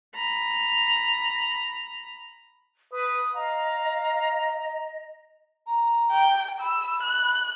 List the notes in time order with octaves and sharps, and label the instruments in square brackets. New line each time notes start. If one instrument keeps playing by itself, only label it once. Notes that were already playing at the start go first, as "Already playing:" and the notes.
[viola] A#5 B5
[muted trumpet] B4 [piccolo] D#6
[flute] D#5 [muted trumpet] F5 [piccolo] A#5
[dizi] A#5
[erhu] G5
[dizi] B5 [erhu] E6
[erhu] F#6